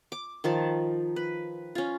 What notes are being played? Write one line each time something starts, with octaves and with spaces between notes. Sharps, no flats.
D6
D#3 F3 A5
B4
C#4 F4